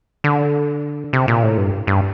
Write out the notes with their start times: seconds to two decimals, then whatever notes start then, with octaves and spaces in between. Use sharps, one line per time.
0.24 D3
1.13 C3
1.28 A#2
1.43 A2
1.57 G2
1.87 G2